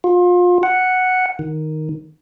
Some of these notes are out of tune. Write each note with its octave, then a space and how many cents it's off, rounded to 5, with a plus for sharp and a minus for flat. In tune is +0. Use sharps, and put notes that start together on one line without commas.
F4 +30
F#5 +0
D#3 +0